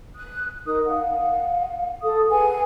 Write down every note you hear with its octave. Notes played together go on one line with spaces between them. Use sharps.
D#6 F#6
D#4 A#4 D#6
F5 F#5
A4 D#6
G#4 B4 F#5 G#5